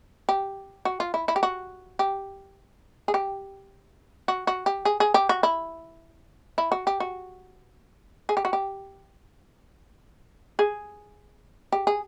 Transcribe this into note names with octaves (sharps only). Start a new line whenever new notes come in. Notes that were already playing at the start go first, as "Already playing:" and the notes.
G4
F#4
F4
E4
E4
G4
F#4
G4
G#4
G4
F#4
F#4
G4
G#4
G#4
G4
F#4
E4
E4
F#4
G4
F#4
G#4
G4
F#4
G4
G#4
G4
G#4